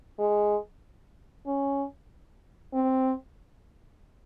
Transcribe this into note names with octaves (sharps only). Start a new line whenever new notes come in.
G#3
C#4
C4